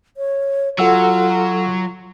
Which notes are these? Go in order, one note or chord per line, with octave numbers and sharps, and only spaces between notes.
C#5
F#3 F4 A4 F#5 E6